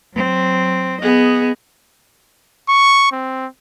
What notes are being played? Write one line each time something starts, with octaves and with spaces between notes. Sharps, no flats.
F#3 C4
B3 G#4 D#5
C#6
C4